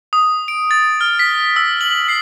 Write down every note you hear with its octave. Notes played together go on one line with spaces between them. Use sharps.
D#6
D7
A6
F6
B6
E6
F#7
C7